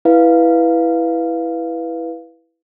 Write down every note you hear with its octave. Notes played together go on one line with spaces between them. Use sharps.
E4 B4 F5